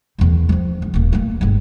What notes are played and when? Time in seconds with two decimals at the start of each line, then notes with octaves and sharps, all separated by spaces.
0.18 E2 D#3
0.49 F3 C#4
0.82 C#2
0.94 D#1 A#3
1.12 A3 A#3
1.41 G1 G#2